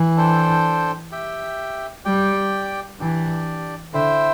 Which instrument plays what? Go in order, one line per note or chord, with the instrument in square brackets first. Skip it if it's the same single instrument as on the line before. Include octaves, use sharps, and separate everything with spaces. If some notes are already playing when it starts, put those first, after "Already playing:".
Already playing: [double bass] E3
[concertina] D4 A4 C5 G5
G4 E5 G5
[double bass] G3 [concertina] G4 D5 G5
[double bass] E3 [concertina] D4 G4 D5
[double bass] D3 [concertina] E4 C5 E5 G5